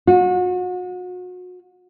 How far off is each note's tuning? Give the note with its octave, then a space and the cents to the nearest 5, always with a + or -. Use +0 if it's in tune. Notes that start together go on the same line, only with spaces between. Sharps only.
F#4 -35